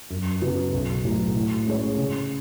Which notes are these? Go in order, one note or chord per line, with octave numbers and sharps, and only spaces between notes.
F#2
C#3 F#3 B3 F#4
B1
A2 F#3
A2
G#3 C#4 G#4 C#5
C#3